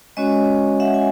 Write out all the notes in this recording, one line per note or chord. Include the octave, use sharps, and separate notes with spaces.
G#3 C#4 F#4 C#5 D#5
E5 F#5
G#5